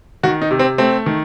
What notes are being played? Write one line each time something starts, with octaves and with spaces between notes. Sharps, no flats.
D#3 F#4
D#4
C3
C4
A3 C4
D#3